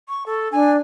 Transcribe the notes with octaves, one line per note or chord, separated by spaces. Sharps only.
C#6
A4
D4 G#5